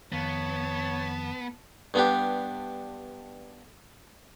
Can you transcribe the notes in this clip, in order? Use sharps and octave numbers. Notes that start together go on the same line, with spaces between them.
F2 D#3 B3 C#5 F5 A5
G2 B3 D4 G4